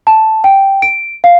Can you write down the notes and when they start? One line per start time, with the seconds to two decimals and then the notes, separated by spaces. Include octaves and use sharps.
0.07 A5
0.44 G5
0.82 D7
1.24 F5